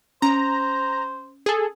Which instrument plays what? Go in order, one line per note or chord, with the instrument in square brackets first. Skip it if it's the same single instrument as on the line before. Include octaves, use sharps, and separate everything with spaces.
[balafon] C#4 [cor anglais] C5 [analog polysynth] A#5
[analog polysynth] G#4 A4